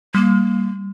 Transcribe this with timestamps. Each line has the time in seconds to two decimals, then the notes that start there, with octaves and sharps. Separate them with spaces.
0.15 G3 A#3